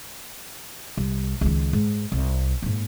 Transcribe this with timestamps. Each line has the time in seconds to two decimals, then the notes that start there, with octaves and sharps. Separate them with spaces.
0.97 C2
1.41 C#2 D#3
1.73 G#2
2.12 C2
2.62 G#2 A#3